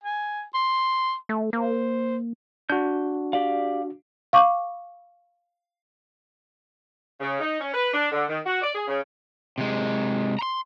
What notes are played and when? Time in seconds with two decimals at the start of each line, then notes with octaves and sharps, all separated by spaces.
0.04 G#5
0.54 C6
1.29 A3
1.53 A#3 C5
2.70 D4 F#4 G6
3.33 G4 D5 F5
4.33 F5 C#6 D6
7.20 C#3
7.40 D#4
7.60 C#4
7.74 B4
7.93 D4
8.11 D3
8.28 D#3
8.45 F#4
8.62 D5
8.75 G#4
8.87 C#3
9.58 C3 G#3
10.39 A#5 C6